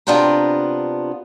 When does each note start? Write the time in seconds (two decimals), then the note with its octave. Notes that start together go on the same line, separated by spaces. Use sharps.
0.07 C3 B3 D4 F4 G5 A#5